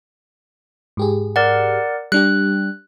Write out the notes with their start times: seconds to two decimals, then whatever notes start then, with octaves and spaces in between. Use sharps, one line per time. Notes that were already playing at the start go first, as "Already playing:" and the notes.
0.97 G#2 G4 G#4
1.36 A#4 D5 F#5
2.12 G3 D4 G4 F#6